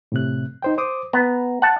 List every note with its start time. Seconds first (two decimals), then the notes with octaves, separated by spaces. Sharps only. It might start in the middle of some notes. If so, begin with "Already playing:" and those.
0.12 A2 C3 F#6
0.62 D#4 C5 G5
0.78 C5 D6 D#6
1.13 B3 A#5
1.62 F#5 A5